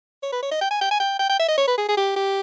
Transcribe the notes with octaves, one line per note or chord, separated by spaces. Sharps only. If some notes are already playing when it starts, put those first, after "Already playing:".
C#5
B4
C#5
D#5
G5
G#5
G5
G#5
G5
G5
G5
E5
D#5
C#5
B4
G#4
G#4
G4
G4